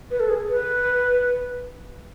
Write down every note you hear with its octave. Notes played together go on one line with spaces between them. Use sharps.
B4
A4
G#4
B4